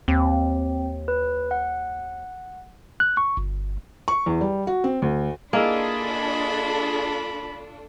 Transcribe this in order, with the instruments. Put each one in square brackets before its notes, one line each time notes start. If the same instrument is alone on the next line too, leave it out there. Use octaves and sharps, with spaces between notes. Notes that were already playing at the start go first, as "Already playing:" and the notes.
[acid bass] D#2 [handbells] C4
[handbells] B4
F#5
[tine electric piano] F#6
C#6
G1
[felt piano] C#6
E2
G3
F#4
C4
D2
[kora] A#3 E4 [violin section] D4 F4 A4 [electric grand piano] G#4 D#5 [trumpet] B5